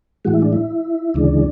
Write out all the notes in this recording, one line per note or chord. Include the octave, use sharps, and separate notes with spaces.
A2 E3 G#3 F#4
E4
D4
E4
D2 C#3 E3 G#3 D4